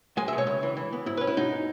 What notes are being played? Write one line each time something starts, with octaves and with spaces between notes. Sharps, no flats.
G#3 G#5
B2 E5
C#5
C#2
E3
E3
B3
G#2 E4
C#4 B4
E4
B2 D#4